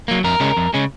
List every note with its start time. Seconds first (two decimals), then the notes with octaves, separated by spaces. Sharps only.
0.08 F#3 A#3
0.24 F2 A#4
0.40 C#3 G#3 C#4
0.57 F2
0.74 C#3 G#3 C#4